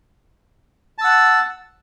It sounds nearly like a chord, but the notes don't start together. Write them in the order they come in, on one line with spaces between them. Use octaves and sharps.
A5 E6 F#5